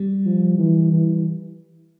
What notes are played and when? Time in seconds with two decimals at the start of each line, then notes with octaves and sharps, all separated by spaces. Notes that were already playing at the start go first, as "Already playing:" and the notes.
Already playing: G3
0.26 F3
0.58 E3
0.92 E3